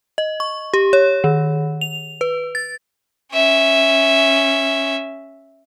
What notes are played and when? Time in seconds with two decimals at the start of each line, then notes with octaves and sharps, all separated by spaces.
0.18 D#5
0.40 C#6
0.74 G4
0.93 C#5
1.24 D#3
1.81 F7
2.21 B4
2.55 A6
3.33 C#4 E5